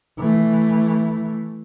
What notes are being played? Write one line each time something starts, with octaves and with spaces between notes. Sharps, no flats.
E3 A3